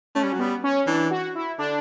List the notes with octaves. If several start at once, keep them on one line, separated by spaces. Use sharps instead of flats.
A3 C#4
G3
F#3
G3 B3
C#4
E3 D4
F#4
E4
D3 D4